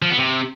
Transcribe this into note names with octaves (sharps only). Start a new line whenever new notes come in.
F3
B3
C3